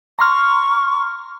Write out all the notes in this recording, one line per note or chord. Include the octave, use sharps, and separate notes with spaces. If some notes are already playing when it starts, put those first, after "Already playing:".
A#5 C6 C#6 F6